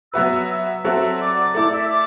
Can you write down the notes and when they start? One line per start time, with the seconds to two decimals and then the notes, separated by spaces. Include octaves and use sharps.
0.13 F#3 B3 F#4 B4 E5 E6
0.49 E5 E6
0.84 F#3 C4 F#4 A4 E5 E6
1.20 D5 D6
1.55 A3 E4 A4 D5 D6
1.72 E5 E6
1.91 D5 D6